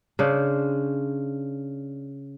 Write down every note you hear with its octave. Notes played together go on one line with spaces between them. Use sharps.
C#3 D4 C5